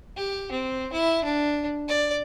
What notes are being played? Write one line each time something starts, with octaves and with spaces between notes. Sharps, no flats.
G4
C4
E4
D4
D5